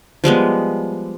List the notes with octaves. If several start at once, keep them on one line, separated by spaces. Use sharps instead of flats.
F3 G3 G#3 B3